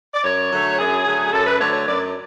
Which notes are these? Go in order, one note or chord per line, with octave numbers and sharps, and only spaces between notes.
D5
F#2 C#5
D3 F#3 A3
F#2 G#4
D3 F#3 A3
F#2 A4
B4
D3 F#3 A3 C#5
C#5
F#2 D5